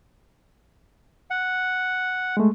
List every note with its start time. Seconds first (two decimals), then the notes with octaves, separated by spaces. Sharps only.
1.30 F#5
2.37 G#3 A3